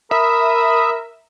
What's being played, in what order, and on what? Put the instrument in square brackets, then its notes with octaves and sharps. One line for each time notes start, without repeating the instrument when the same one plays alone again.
[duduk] A#4 [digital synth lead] E5 [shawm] B5 [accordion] D#6